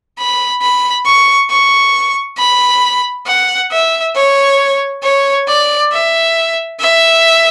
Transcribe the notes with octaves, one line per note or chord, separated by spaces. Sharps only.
B5
B5
C#6
C#6
B5
F#5
E5
C#5
C#5
D5
E5
E5